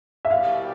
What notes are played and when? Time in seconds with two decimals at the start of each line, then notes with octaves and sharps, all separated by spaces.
0.25 E5
0.31 C2 B2 G3 F5